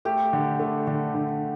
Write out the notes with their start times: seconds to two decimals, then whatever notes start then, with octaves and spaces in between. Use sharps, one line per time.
0.05 A3 G4
0.33 D3
0.60 A3
0.87 D3
1.15 D3